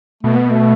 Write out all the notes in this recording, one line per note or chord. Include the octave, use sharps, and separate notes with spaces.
B2 A3
B3
A3